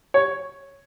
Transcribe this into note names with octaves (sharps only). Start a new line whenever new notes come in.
C#5